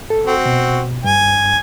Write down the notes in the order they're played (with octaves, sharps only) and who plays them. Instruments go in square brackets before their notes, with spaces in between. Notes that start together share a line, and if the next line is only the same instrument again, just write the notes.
[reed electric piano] A4
[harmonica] C4 F#4
[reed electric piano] B2
[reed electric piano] G2 [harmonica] G#5